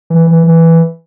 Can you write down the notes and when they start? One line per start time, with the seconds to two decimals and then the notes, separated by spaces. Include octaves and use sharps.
0.10 E3
0.27 E3
0.43 E3